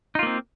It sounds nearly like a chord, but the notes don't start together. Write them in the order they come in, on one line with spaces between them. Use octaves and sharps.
D#4 F4 A#3 C4